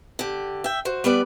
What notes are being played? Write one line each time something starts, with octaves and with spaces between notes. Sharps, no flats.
D3 G4
E5 G5
F#4 C5
G3 B3 B4 D5